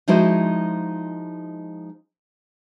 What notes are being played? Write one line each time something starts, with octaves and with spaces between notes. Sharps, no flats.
F3 G#3 D#4 E4 F#4 C5